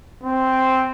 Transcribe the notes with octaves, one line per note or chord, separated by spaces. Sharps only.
C4